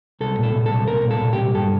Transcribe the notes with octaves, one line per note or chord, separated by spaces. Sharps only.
C2 A4
A#2 A4
A#2
A4
C2
C2 A#4
A#2
A4
A#2
C2 G4
G2 A4